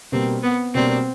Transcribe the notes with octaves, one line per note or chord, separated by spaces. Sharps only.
B2 G3 A#3 C4 D4
B3
B2 G3 A#3 C4 D4